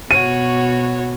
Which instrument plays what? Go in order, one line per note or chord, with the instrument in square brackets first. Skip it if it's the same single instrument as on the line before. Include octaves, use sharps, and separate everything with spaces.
[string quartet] B2 [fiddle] F#4 C#5 [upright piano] D#7